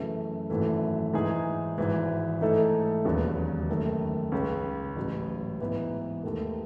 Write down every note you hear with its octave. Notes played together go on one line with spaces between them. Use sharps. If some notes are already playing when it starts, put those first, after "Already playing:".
Already playing: F#2 C#3 E3 A3
G#1 F#2 E3 A3
G#2 E3 G#3 D#4 G#4
G#1 G#2 E3
G#2 E3 A3 D#4 A4
E1 D#2 C#3 F#3 B3
F#2 D#3 A3
C#2 C#3 G#3 C#4
A1 G#2 F#3
G#2 E3 B3 D#4
D#2 D#3 A3